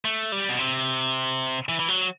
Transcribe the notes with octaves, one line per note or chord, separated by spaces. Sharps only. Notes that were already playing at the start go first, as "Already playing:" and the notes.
A3
G3
B2
C3
E3
E3
F#3